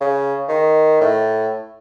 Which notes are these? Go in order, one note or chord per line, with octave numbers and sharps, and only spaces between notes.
C#3
D#3
A2